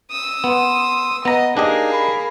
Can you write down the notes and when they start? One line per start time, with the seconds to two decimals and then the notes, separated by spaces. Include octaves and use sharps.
0.12 D#6 E6
0.44 B3 C6
1.25 B3 D#5 A#5
1.57 A#3 D4 D#4 G4 G#4 D#5
1.93 B5